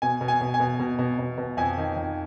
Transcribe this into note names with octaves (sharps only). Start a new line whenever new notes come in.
B2 G#5
B2
G#5
B2
G#5
B2
B2
B2
B2
B2
F2 G#5
D#3
F2